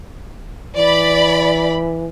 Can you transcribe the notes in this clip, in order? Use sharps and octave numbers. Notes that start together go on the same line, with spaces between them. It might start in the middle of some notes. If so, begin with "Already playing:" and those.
E3 D5 B5